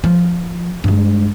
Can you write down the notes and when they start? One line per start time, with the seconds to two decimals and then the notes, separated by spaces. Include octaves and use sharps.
0.04 F3
0.84 G2 G#3